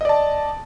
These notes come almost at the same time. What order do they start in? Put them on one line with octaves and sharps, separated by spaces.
D#5 D5 A5